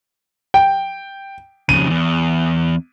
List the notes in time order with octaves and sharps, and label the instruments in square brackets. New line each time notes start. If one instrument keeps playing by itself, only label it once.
[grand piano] G5
[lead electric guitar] F2 C#3 [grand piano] D#7
[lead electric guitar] E2